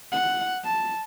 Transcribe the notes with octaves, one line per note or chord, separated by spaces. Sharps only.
F#5
A5